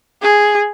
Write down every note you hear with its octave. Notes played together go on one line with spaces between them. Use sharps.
G#4